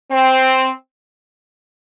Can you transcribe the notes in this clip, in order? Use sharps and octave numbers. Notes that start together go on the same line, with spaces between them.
C4